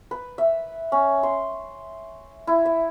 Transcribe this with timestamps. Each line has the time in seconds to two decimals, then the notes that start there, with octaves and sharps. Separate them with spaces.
0.11 B4
0.38 E5
0.92 C#4
1.23 C6
2.47 E4
2.65 E5